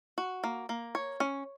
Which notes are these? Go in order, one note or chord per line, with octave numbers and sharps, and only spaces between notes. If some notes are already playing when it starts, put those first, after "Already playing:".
F#4
A#3
A#3
C#5
C#4